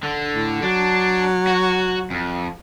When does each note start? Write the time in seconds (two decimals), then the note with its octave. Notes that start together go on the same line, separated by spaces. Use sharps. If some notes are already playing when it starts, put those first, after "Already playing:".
0.03 D3
0.34 A2
0.62 F#3 D4
1.47 F#4
2.10 F2